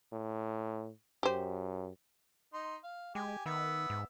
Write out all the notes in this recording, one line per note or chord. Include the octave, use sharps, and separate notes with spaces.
A2
F#2 G4 C5
D#4 C6
F5
G#3 G4 G#5
D#3 B3 E5
G#2